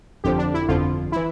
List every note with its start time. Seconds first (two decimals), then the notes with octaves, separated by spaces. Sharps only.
0.24 G1 F2 D3 F3 G4
0.38 D4
0.54 E4
0.68 G1 F2 D3 F3 F4
1.12 E3 E4